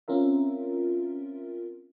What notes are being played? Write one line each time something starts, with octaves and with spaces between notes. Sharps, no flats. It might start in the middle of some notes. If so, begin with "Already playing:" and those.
C4 C#4 F4 A#4 E5